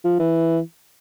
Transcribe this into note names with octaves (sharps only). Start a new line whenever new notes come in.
F3
E3